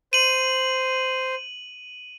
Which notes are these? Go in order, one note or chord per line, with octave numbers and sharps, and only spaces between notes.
C5 D#7 F#7